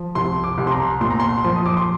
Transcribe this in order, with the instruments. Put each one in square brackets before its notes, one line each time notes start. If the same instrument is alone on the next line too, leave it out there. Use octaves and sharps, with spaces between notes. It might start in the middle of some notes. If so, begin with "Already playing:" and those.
Already playing: [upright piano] F3
C2 C6
D6
C2
C6
A#5
A#2 C6
A#5
C6
F3 C6
D#6
D6
C6